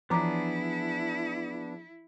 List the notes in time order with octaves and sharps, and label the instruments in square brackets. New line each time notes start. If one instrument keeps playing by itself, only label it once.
[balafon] E3 A#5 D6 [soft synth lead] F3 [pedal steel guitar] B3 D4 G#4 [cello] E4